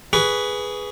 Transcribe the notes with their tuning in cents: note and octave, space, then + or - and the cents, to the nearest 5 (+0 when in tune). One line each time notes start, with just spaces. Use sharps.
G#4 +0 B4 +0 C#6 +35